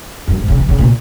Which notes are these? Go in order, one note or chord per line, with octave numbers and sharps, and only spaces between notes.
F#2
G#2
C#3
E3
C#3
A#2